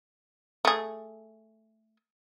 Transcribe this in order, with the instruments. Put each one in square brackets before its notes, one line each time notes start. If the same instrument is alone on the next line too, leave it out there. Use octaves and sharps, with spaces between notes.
[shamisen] A3 G#4